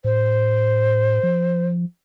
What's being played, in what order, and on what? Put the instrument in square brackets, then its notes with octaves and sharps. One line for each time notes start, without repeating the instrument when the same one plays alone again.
[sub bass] A2 [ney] C5
[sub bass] F3